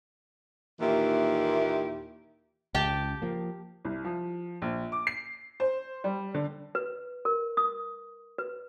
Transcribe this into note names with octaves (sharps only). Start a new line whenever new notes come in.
D#2 A#2 D#3 E3 E4 G4
C#2 G4 G5 A5
F3 A#3
C2
F3
A#1
D6
C7
C5
G3
D3
B4
A#4
D#6
B4